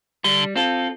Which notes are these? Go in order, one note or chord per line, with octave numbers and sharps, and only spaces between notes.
D3 G3
C4 F4 A4